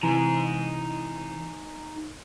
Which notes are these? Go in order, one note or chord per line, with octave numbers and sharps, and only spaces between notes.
C3 E3 D#4 G#5 A#5